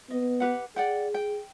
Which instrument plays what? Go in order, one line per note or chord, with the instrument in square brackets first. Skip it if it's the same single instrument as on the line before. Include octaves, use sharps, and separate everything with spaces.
[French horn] B3 [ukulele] D#5
[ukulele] G4 B4 F#5
[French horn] G#4 [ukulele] D5 F#5 G5
[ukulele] G5